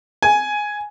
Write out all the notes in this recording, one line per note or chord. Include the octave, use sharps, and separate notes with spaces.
G#5